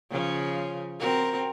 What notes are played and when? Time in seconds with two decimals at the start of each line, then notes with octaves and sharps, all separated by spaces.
0.10 C#3 F3 C#4
0.99 C4 F#4 A#4